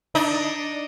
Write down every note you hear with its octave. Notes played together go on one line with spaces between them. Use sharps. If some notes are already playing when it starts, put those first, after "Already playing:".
D4 D#4